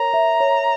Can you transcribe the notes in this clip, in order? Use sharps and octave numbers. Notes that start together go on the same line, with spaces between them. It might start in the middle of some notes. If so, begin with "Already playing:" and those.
Already playing: A#4 C#5 A#5
E5
C#5